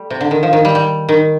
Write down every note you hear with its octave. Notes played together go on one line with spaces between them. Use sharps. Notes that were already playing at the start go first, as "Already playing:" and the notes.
Already playing: G3 A3
C3
D3
D#3
F3
D#3
G3
G3
D#3